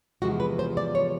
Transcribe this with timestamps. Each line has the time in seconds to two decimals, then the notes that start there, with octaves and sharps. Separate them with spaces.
0.22 E2 C3 F3 G#3 F#4
0.40 B4
0.59 C5
0.77 D5
0.95 C#5